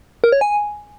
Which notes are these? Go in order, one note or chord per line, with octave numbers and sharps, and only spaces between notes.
A#4
C#5
G#5